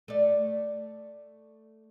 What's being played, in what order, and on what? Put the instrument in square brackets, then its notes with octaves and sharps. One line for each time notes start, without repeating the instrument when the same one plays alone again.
[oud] A3 D5